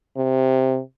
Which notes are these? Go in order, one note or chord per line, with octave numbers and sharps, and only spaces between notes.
C3